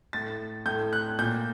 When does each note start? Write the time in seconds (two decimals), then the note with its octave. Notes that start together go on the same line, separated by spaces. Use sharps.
0.13 A2 A6
0.66 A2 G6
0.93 F#6
1.19 A#2 G6